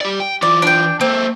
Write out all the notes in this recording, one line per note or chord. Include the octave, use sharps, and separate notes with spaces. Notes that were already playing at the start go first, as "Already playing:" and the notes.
G4 D5
G5
E3 F4 D5
D4 G5
A#3 C4 A4